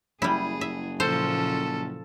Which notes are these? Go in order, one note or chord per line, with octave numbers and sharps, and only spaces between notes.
F#1 G3 E4 G#4
E5
A#2 C#3 F3 A4 C5